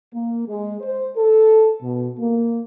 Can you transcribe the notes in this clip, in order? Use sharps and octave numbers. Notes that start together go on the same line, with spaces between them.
A#3
G#3
C5
A4
B2
A#3